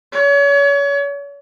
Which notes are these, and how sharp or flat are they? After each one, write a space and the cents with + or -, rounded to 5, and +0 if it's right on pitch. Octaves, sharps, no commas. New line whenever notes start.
C#5 +35